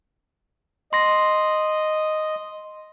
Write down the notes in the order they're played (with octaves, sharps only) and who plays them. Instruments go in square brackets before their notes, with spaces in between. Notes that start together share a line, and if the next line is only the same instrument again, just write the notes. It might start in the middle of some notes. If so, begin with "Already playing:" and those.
[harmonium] D#5 [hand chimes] C6 A#6